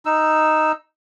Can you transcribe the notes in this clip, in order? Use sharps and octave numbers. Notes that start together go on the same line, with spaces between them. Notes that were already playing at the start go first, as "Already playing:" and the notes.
D#4 E6